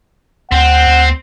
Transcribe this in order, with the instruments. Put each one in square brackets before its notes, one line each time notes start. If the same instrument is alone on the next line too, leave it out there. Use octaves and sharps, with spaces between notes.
[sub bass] D2 [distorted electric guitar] C4 [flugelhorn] F#5
[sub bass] D2